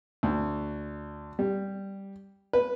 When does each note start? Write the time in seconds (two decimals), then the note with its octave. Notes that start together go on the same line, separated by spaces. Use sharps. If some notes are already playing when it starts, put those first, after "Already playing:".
0.23 D2
1.39 G3
2.53 B4